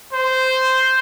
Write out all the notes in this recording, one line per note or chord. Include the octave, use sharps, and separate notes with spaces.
C5